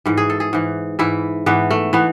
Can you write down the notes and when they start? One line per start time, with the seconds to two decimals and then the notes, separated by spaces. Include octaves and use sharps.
0.06 G#2 E3
0.17 G#4
0.30 A4
0.40 G#4
0.53 G#2 E3
0.99 G#2 E3 E4
1.46 G#2 E3 B3
1.71 A3
1.93 E3 B3